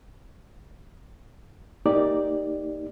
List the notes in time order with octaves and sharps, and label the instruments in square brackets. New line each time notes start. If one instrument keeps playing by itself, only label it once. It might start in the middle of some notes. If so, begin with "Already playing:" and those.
[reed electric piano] A#3 D#4 G4 D5